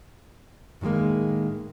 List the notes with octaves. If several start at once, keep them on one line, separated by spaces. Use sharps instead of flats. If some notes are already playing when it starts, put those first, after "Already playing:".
A2 D#3 F#3 G#3 A#3